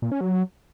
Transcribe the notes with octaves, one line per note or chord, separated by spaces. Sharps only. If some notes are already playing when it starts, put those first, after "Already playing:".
A#2
C#4
F#3